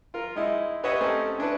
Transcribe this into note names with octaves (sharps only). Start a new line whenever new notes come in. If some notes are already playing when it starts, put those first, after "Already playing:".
F4 A#4
G#3 D#4 E4
G4 B4 C#5 D#5 E5 F#5
A3 C4 C#4 D#4 G4 A#4
C#4 D4 E4 B4